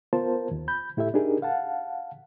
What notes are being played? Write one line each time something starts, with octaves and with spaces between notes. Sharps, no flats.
B3 F4 A#4 C5 A5
D#2
B5 G6
A2 E4 G4 A4 E5
D4 D#4 G4 G#4 A#4
F5 F#5 A5